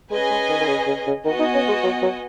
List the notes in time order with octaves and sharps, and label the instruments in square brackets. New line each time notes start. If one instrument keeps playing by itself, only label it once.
[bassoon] G#3 [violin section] C#4 G#4 B4 D#5 G#5
[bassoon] G#3
D#3
D#3
C#3
C#3
C#3
[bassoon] D#3 [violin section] B3 F#4 D#5 G#5
[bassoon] D#4
C#4
G#3
F#3
F#3